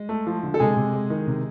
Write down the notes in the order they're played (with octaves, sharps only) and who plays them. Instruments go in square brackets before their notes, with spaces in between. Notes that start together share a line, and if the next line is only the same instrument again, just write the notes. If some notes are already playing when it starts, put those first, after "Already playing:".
Already playing: [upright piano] G#3
[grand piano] A3
F3
D3
[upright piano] A4
[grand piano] C3 [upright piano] G#3 G#4
[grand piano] C3
G#3
D#3
C3